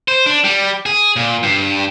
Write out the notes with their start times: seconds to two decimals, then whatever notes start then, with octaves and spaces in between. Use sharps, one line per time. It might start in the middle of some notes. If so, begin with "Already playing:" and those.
0.08 C5
0.26 D4
0.44 G3
0.86 G#4
1.16 A#2
1.43 G2